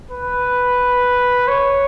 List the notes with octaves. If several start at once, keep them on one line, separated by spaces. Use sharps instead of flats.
B4
C#5